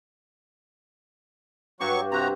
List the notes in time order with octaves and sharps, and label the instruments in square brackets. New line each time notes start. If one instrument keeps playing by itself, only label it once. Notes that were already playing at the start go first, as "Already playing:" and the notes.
[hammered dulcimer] G2 F#4 G4 [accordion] F#3 C#6
[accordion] C3 F#4 A#5 [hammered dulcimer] C4